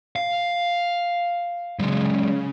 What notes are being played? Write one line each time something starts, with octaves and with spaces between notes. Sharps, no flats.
F5
C#3 F#3 G#3